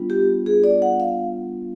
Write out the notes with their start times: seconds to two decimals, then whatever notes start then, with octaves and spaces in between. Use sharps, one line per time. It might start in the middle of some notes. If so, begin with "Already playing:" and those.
Already playing: G3 B3 D4 F4
0.10 G4
0.46 G#4
0.64 D5
0.82 F#5
1.00 F5